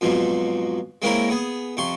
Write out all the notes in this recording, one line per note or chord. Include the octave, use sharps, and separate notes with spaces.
F2 G#2 B2 F3 F#3
G#3 A#3 C4 C#4 E4 A#4
B3 G#4
F2 C3 C6 C#6